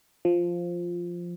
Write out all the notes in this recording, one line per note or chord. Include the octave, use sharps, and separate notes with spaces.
F3